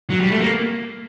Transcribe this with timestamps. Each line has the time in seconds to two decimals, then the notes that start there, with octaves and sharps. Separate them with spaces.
0.10 F#3
0.21 G3
0.31 A3
0.41 A#3